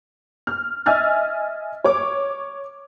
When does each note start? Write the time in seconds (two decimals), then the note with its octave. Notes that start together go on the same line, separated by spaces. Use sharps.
0.47 F6
0.86 D#5 E5 G#5 E6 F6 A6
1.84 C#5 C#6 D6